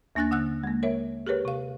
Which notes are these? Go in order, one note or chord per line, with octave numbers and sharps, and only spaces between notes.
D#2 A#3 D4 G#5 F#6 A6
D3 F#5 E6 F#6
G#3 A#3
A#4 C#5 E5
G4 G#4 A#4 B4 C#5
C3 F5